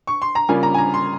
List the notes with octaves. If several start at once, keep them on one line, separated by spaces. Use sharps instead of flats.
C#6
C6
A#5
C#3 G3 A#3 F4 G#5
A#5
G#5
A#5
C6